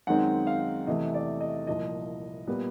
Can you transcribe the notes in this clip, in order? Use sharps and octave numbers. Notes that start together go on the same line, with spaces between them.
F#2 D#3 G#3 C4 D#4 F#5
F5
E2 C3 E3 A3 D#5
D5
D#5
C2 A#2 F3 D#5
A#2 G3 B3